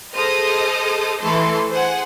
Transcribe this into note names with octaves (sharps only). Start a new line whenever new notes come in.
G#4 A4 C5 D#5 D#6 F6
E3 A3 A4 C6
G#4 C5 F#5 G#5